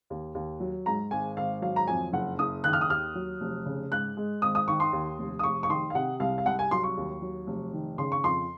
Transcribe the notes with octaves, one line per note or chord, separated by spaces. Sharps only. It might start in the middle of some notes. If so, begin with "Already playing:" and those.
D#2
D#2
F#3
G#2 A#5
G#1 G#5
G#1 F5
F#3 F5
A#5
F2 G#5
F#1 F#5
F#1 D#6
D#3 F#6
F6
D#6
D#2 F6
F#3
F1
C#3
G#2 F#6
G#3
G#1 D#6
D#6
D#3 C#6
C6
D#2
F1
D#6
F1 C#6
C#6
D#3 C6
F5
C3 F#5
C2 F5
F5
C2 F#5
G#5
F#3 C6
C#6
D#2
F#3
F1
D#3
C#3 C6
C#6
F2 C6